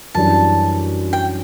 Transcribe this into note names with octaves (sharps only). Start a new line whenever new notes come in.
F#2 E3 G3 D4 A5
G5